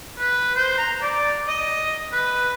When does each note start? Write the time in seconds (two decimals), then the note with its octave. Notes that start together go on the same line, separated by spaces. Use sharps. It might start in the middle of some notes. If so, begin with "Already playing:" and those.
0.19 B4
0.55 C5
0.78 A#5
1.02 D5
1.48 D#5
2.13 B4